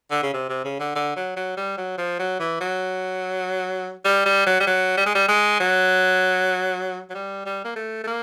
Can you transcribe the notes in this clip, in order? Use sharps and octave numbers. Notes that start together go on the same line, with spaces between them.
D3
C#3
C3
C3
C#3
D3
D3
F#3
F#3
G3
F#3
F3
F#3
E3
F#3
G3
G3
F#3
G3
F#3
G3
G#3
G3
G#3
F#3
F#3
G3
G3
A#3
A3
A3
A#3